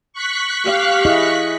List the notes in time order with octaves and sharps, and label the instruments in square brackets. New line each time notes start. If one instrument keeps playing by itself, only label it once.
[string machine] C#6 F#6 B6
[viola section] G4 F5
[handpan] E4 G#4 D#5